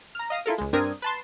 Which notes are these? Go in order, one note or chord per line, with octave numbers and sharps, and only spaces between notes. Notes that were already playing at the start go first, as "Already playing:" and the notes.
A#5 F6
D#5 F5 D#6
E4 F4 A4 A#4
C#2 G#3
G2 C4 D4 A#4 D#6 G#6
B4 A5 C6